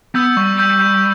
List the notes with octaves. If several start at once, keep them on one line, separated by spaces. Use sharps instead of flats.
B3 E6 G6
G3 C#6
E6 G6
G6